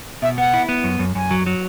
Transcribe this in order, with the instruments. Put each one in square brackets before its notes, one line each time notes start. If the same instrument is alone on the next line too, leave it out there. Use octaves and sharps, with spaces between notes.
[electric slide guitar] B2 [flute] E5
[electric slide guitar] B3 [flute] F#5
[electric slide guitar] E4
B3
F#2
F#2
[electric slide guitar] F#2 [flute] G#5
[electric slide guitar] F#3
F#3